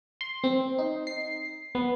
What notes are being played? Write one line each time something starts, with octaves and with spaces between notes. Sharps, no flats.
C6
C4
D#4
C7
B3